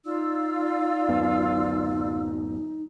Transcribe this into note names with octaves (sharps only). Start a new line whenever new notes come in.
D#4 F4 D5 E6
D1 F#2 B3